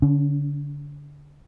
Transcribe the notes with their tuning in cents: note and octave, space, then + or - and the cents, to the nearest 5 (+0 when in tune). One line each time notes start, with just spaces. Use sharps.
D3 -25 C#4 +25